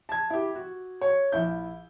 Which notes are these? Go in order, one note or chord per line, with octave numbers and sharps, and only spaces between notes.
A5 G#6
E4 G4
F#4
C#5
A#1 E4 G6